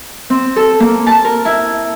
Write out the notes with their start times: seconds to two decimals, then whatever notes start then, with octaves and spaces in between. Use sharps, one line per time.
0.30 C4
0.56 A4
0.80 A#3
1.07 A5
1.25 A#4
1.45 E4